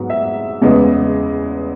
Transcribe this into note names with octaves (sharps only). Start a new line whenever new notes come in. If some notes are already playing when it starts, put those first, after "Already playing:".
Already playing: G#2 F#3 B3 F#5
E5
E2 C#3 G#3 B3